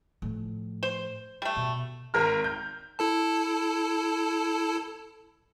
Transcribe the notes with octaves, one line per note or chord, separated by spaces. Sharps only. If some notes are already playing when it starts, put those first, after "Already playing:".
A2 F3
C5
G3 A3
B2
G#1 A#4 F6
G6
E4 A4 A5